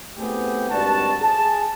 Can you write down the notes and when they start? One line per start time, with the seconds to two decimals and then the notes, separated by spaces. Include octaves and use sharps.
0.17 A3 B3 C4 E4 G4 G#4
0.70 G#1 G2 D4 F#4 A5
1.21 G#4 A5